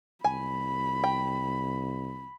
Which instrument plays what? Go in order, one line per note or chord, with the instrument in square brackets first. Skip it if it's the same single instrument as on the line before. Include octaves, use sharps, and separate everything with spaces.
[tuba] C2 [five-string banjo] G#5 [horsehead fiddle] B5
[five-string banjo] G5